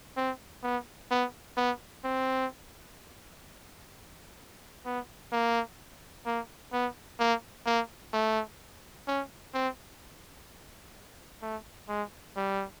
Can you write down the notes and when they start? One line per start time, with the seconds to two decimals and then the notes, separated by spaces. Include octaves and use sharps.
0.17 C4
0.63 B3
1.11 B3
1.57 B3
2.04 C4
4.85 B3
5.32 A#3
6.26 A#3
6.73 B3
7.19 A#3
7.66 A#3
8.13 A3
9.07 C#4
9.54 C4
11.42 A3
11.88 G#3
12.36 G3